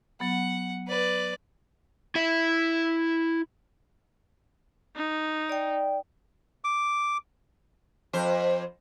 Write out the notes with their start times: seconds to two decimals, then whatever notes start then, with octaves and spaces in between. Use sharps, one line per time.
0.20 F#3 B3 F#5
0.88 B4 D5
2.15 E4 E5
4.96 D#4
5.49 D5 G5
6.64 D6
8.13 F2 C5